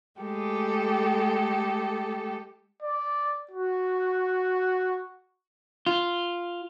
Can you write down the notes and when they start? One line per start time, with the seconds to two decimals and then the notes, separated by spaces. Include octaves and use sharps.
0.20 G#3 A3 G4 A4
2.83 D5
3.51 F#4
5.86 F4